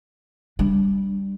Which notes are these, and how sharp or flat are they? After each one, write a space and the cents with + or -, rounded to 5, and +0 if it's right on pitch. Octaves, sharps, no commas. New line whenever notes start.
G3 +0 D4 +0